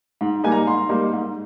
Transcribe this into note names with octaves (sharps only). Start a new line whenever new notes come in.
G#2
G3 A#3 D#4 G#5
A#5
G#2 C6
G3 A#3 D#4
G#2